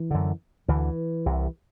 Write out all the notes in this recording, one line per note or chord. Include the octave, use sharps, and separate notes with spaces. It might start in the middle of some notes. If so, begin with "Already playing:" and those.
Already playing: E3
F#2 D3
D2 D3 E3
C2 C3